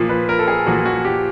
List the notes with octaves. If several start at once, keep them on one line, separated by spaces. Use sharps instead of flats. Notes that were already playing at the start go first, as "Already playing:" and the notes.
Already playing: A#2 F3
B4
A#4
A4
G#4
A#2 F3 F#4
F#4
G4